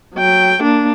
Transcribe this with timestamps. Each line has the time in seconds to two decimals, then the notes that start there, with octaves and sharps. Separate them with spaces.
0.15 F#3 G5
0.62 A#3 D4